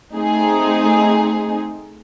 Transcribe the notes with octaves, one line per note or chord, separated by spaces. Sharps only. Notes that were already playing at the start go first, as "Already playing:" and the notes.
A3 C4 D#4 G#4